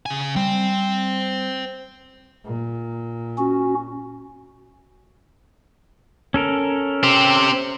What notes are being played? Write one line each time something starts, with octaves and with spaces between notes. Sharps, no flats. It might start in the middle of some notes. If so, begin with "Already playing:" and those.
C#3 G#5
G3 C5 G5
A#2
C#4 F#4
C#4 A4 A#4
C4 G4